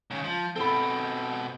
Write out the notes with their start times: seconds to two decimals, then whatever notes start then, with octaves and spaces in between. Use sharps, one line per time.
0.11 D#2 C#3
0.24 F3
0.56 B2 C4 A4 B5